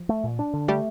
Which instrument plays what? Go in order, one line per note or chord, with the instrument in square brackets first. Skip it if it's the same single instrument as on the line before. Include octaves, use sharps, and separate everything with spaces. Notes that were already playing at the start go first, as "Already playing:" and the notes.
Already playing: [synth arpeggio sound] F3
[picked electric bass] A3
A#2
D4
D3
[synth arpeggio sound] G3 G4 [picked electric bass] A3